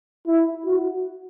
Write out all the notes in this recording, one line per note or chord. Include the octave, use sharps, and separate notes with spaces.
E4
F#4